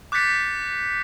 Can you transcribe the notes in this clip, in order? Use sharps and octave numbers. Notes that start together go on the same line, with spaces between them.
D6 F#6 G6 A6 B6 C#7